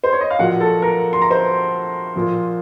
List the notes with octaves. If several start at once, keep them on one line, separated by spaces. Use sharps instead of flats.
C5
C#5
D#5
F5
A#2 F3 F#4 F#5
A4 A5
A#4 A#5
C6
A#5
C5 C6
A#2 F3